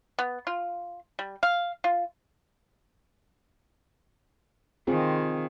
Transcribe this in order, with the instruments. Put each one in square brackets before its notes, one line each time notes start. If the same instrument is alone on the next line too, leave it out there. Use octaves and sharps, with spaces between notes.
[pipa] B3
F4
G3
F5
F4
[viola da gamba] D#3 [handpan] C4 F4 G#4